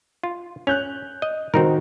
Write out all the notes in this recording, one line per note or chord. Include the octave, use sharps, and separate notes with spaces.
F4
C#4 F#6 G6 F7
D#5
D#3 C4 D#4 F#4 A#4